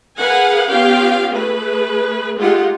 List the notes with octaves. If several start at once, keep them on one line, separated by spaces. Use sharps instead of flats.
G#4 A#4 B4 F5 F#5 G#5
B3 C#4 F4 G4 F5 G5
A3 G#4 B4
G#3 A3 D#4 F4 G4 F#5